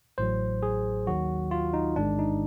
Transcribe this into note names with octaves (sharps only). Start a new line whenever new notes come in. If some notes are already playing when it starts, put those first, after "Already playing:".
A1 A2 F#3 C5
G#4
D#2 D#3 F#3 F#4
F4
D#4
A1 G#2 D#3 G#3 D4
D#4